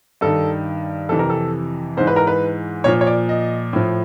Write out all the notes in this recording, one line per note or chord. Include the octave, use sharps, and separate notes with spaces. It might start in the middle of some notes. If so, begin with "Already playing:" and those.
G2 D#3 A4
F2 C3 E3 A4
A#4
A4
G#2 E3 C5
B4
A#4
B4
A#2 F3 C#5
C#5
D5
D#5
A2 F3